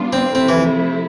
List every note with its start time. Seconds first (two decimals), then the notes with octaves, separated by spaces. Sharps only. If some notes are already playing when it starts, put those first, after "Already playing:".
Already playing: G3 B3 D4 F4
0.13 C4
0.34 C3 F3 A3 C4 E4
0.49 E3